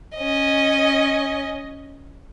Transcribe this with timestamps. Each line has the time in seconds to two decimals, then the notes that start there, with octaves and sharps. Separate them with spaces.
0.16 C#4 D#5